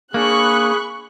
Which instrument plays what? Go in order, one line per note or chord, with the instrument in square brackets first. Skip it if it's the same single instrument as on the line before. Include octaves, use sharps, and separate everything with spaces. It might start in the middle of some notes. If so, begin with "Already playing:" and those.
[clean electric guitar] A#3 D4 [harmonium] G#4 [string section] B5 C#6 F#6